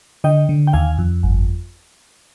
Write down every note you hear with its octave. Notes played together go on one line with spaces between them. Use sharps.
D3 D#5 G5
D3
G5
D#2 F5 G#5
F2
G1